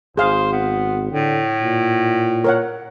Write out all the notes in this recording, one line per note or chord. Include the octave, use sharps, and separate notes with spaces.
G#1 G#4 C5 F5
B3
A2 D3
A#2
A#4 C#5 F#5